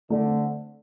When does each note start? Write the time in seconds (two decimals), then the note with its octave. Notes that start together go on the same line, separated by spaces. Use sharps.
0.10 D3 A3
0.27 C4